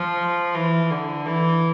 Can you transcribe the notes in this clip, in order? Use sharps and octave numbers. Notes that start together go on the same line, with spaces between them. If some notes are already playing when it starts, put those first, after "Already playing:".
Already playing: F3
E3
D3
E3